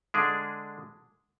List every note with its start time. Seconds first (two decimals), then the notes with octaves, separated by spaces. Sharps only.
0.14 D3 G#3 D4 G#4